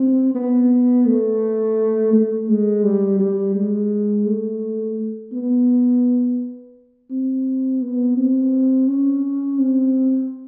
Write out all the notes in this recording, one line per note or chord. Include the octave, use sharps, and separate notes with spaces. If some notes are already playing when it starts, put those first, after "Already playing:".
Already playing: C4
B3
A3
A3
G#3
G3
G3
G#3
A3
B3
C4
B3
C4
C#4
C4